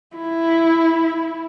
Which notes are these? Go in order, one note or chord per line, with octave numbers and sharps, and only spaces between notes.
E4